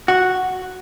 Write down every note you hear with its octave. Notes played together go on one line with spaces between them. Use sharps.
F#4